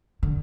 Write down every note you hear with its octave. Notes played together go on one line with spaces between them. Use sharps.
D3